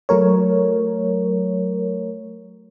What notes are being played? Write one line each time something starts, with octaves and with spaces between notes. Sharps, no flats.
F#3 A3 A#4 C#5